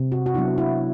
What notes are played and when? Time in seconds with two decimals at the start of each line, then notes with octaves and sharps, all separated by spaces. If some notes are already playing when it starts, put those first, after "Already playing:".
Already playing: C3
0.12 F#4
0.26 F#4
0.34 F#3 B3 D4 E4
0.58 E4